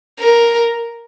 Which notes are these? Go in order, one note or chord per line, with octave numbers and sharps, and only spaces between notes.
A#4